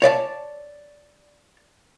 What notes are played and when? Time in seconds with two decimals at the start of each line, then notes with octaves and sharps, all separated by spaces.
0.02 C#5 D5 E5 A5